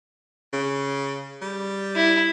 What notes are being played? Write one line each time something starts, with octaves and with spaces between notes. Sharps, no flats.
C#3
G3
E4